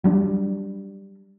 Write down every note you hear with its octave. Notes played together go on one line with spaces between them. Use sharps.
F#3 G3 D4